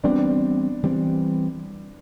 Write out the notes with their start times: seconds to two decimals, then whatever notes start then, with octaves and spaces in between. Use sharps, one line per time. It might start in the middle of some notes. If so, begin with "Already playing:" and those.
0.04 E3 G3 B3 C4 D4
0.83 E3 G3 C4